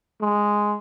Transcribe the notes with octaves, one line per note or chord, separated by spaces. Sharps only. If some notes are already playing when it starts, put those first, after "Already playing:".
G#3